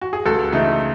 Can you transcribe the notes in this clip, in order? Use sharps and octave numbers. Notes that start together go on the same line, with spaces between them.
F#4
G#4
C#2 F#4 A4
C#3 E3 A3 D#4